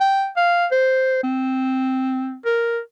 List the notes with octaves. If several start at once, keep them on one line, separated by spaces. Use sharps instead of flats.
G5
F5
C5
C4
A#4